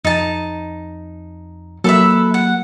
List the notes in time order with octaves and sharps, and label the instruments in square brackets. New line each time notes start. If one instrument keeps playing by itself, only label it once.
[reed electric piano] F2 [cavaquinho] D#4 A5
[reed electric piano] F#3 A#3 [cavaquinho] A4 B4 E5
[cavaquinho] F#5